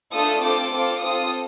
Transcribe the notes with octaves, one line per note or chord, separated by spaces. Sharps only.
A3 D4 F4 A4 D#6
C4 F4 A4 D6
C4 F4 A4
C4 F4 A4 D#6